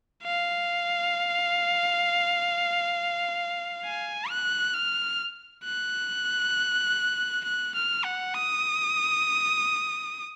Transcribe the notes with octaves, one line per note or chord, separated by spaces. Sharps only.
F5
G#5
F#6
F6
F#6
F#6
F6
F#5
D#6